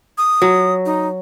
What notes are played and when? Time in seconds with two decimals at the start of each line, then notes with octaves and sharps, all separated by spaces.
0.18 D#6
0.42 F#3
0.86 D#4